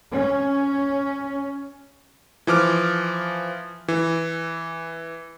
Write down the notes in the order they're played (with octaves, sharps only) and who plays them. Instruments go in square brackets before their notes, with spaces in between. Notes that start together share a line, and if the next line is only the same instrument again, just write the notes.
[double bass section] C#4
[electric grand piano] E3 F3 D6 F6
E3